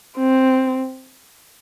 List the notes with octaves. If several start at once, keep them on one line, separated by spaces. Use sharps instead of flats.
C4